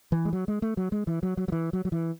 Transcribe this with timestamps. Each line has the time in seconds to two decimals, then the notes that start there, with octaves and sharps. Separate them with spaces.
0.12 E3
0.25 G#3
0.33 F#3
0.48 G#3
0.62 A3
0.77 F#3
0.92 G#3
1.07 E3
1.23 F#3
1.37 F#3
1.48 F#3
1.52 E3
1.73 F#3
1.85 F#3
1.92 E3